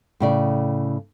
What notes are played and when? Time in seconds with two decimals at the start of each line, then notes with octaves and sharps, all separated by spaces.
0.20 A2 C#3 D5